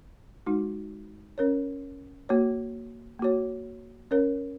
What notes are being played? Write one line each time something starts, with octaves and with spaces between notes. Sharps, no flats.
G#3 D#4 F#4
C#4 A#4 C#5
A#3 F#4 C#5
A#3 F#4 C#5
C#4 A#4 C#5